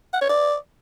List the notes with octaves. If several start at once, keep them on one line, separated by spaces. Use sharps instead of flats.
F#5
C#5
D5